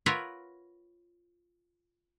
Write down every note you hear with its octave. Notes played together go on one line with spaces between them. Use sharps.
F4 A#4 B4 C#5 E5 F#5